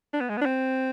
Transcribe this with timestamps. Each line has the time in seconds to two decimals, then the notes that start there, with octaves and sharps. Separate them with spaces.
0.13 D4
0.21 B3
0.29 G#3
0.37 B3
0.41 D4
0.46 C4